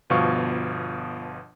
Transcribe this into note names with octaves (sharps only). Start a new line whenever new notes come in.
G1 B2 F3 F5 C#6